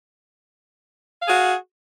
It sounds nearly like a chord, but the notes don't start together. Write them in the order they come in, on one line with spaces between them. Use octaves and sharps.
F5 G#4 F#4